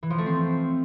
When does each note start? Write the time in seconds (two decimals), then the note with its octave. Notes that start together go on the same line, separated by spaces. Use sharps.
0.03 E3
0.10 F3
0.18 A3
0.26 C4